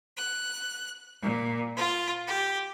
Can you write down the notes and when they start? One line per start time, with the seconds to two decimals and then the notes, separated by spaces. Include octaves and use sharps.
0.16 F#6
1.23 A#2
1.76 F4
2.27 G4